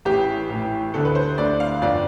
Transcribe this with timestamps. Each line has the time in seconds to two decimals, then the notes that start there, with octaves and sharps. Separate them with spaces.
0.05 A1 A2 E3 G4
0.49 A1 A2 E3
0.93 D2 D3 A3 A4
1.05 B4
1.15 C5
1.38 D2 D3 A3 D5
1.60 F5
1.82 G1 F2 D3 D5